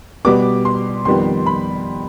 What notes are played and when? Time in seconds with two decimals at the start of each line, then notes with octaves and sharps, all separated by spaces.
0.25 B2 G3 B3 D6
0.65 C6
1.05 F2 D#3 G3 B3 C6
1.46 B5